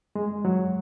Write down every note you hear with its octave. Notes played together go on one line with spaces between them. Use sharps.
G#3
F#3